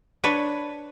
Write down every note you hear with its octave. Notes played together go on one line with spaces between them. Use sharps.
D4 B4 C#5